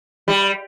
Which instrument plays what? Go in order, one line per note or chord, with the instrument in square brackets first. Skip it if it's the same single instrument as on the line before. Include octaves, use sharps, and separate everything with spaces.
[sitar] G3